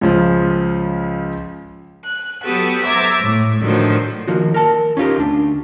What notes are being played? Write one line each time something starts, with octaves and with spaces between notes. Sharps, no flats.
C#2 C#3 F3
F#6
F#3 B3 F#4 G4 A4 B4
C5 E5 A#5 D6 G#6 A6
A2
A2 D3 D#3 F3 F#3
D#3 F3 A#3 F#4
A#4 A5
C#4 D#4 F4 G4 A#4
D2 D4